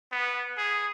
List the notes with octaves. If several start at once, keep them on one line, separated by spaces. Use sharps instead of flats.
B3
G#4